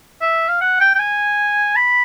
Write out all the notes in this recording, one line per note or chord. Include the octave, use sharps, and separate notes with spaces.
E5
F5
F#5
G5
G5
G#5
B5